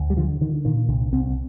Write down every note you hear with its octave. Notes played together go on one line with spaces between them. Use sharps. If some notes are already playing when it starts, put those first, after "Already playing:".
Already playing: D2
G3
D3 F3
D3 D#3
A#2 D#3
C2 D3
C2 C4